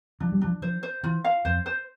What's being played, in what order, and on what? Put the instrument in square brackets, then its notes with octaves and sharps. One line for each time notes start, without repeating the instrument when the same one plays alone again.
[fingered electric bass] F3 [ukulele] D4
[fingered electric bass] G3
[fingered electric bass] F3 [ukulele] D4
[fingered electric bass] F3 [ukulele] C5
[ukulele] C5
[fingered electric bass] E3 [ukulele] F4
[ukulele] F5
[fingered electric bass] F2 [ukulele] C5
[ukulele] C5